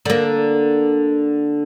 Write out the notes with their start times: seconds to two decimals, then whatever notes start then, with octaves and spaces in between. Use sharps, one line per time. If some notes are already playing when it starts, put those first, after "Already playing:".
0.05 D3 A#3